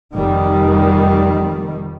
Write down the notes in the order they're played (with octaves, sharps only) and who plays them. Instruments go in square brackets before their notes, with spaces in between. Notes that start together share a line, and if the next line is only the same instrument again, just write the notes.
[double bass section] F1 D#3 G3